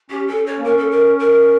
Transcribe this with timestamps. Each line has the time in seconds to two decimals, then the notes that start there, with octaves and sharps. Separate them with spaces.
0.10 C#4 G4
0.28 A4
0.46 C#4 C#5
0.58 A#3
0.64 C#4 A#4
0.78 A4
0.91 A#4
1.20 A#4